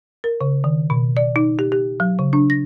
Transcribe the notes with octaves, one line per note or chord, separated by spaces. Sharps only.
A#4
C#3
D#3
B2
D5
D#4
G4
G4
F#3
C#3
D4
A#6